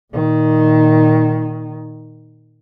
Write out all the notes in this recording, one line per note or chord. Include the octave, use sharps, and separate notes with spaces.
A#2 D#3